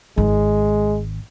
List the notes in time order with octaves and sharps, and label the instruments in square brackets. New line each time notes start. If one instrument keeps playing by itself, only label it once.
[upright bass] G#1 [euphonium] G#3